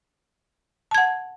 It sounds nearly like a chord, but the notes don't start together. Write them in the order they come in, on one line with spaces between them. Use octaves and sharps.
A5 G#6 F#5